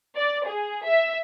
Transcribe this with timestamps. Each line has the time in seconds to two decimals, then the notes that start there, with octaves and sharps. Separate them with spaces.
0.16 D5
0.47 G#4
0.85 E5